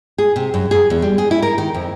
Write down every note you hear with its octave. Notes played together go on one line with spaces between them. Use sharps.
G#4
C3
F#2
G#4
E2
G3
G#4
E4
A#4
D#3
F2